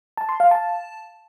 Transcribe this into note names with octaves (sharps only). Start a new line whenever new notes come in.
A5
C6
F5
A5